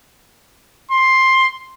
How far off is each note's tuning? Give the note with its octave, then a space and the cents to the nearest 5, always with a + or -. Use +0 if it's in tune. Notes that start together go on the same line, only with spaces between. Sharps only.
C6 +10